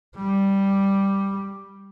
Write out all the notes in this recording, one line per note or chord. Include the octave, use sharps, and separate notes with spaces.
G3